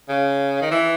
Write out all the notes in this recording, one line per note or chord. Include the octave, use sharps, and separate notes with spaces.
C#3
D#3
E3